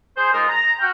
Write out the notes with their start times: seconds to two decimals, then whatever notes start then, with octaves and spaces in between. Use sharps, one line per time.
0.16 G#4 C5
0.32 G#3 D#4 F4 A#4
0.48 A#5
0.78 F#4 F5 G5